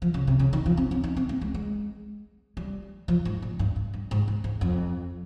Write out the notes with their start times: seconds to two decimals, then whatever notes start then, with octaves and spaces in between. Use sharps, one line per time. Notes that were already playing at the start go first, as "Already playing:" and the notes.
0.02 F3
0.14 C#3
0.27 C3
0.39 C#3
0.53 D#3
0.66 F3
0.77 C4
0.91 C#4
1.04 D#4
1.16 C4
1.29 A#3
1.41 G#3
1.54 G#3
2.57 G3
3.08 F3
3.25 G#2
3.42 A#2
3.59 G2
3.76 G2
3.93 G2
4.11 G#2
4.28 G#2
4.44 G#2
4.61 F2